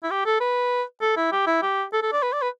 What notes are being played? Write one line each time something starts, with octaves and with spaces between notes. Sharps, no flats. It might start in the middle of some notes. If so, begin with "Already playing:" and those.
E4
G4
A4
B4
A4
E4
G4
E4
G4
A4
A4
D5
B4
D5
B4